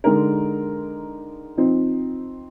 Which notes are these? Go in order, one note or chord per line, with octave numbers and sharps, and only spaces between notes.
D3 G#3 D#4 A#4
F3 C4 D#4